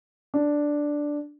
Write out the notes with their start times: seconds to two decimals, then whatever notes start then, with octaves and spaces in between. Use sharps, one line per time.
0.34 D4